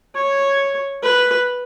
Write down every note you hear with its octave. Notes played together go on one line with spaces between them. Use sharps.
C#5
B4